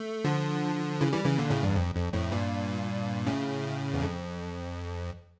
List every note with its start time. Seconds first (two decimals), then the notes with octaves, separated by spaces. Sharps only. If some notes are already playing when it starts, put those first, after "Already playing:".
Already playing: A3
0.25 D3 F3
1.01 C#3 E3
1.13 E3 G3
1.25 C#3 E3
1.38 A#2 D3
1.50 A2 C#3
1.63 E2 G2
1.76 F2
1.95 F2
2.13 F2 A2
2.32 G2 A#2
3.26 A2 C#3
3.94 E2
4.02 F2